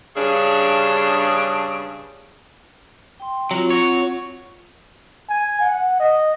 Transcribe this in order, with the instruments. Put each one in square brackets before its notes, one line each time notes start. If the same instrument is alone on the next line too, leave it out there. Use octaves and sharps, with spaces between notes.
[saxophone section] G2 C#3 D4 G#4
[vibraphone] G5 C6
[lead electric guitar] F#3 [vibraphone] C4 F4
[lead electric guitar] F#4 C#5
[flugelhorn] G#5
F#5
D#5